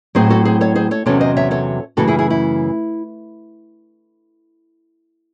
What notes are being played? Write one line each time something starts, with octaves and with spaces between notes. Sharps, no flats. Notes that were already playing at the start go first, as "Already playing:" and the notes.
A2 F#3 C4 G#4 C5
F#4 A4
G#4 C5
A4 C#5
G#4 C5
A4 C#5
E2 C3 F#3 C#4 A4 C#5
C5 D#5
C#5 E5
A4 C#5
F#2 C#3 E3 A3 C#4 F#4 A4
E4 G#4
E4 G#4
E4